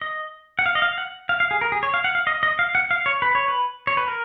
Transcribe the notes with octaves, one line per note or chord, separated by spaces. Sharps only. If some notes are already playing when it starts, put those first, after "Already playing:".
D#5
F#5
F5
D#5
F5
F#5
F5
F5
G#4
A#4
G#4
C#5
F5
F#5
F5
D#5
D#5
F5
F#5
F5
C#5
B4
C#5
B4
C#5
B4
A#4